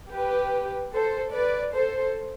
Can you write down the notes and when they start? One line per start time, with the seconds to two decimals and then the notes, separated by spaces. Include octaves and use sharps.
0.11 G4 B4
0.92 A4 C5
1.32 B4 D5
1.73 A4 C5